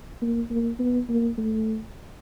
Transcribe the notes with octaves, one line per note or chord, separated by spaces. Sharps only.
A#3
A#3
B3
A#3
A3